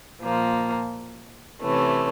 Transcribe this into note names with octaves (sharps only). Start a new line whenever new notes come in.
A#2 F3 A#3
C3 E3 A3 C#4